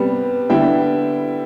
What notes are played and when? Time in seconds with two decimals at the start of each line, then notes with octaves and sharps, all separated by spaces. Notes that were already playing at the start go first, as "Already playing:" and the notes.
Already playing: C3 G3 B3
0.49 D3 G3 B3 E4 G5